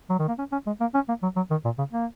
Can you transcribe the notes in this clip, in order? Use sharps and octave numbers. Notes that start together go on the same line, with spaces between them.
F#3
D#3
A#3
C#4
C#4
G#3
A#3
C#4
A#3
F#3
F#3
D#3
A#2
C#3
A#3